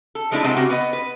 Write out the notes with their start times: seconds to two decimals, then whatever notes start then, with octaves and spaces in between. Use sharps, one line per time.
0.15 A4
0.31 F3 G#3 A3 D4 E4
0.44 C3 G#3 B3 C4 E5
0.56 C#3 F#4 G4
0.70 B3 B4 D#5
0.93 B4